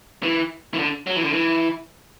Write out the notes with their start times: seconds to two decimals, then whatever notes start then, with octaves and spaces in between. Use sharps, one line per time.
0.23 E3
0.74 E3
0.79 D3
1.07 F#3
1.16 E3
1.24 D3
1.33 E3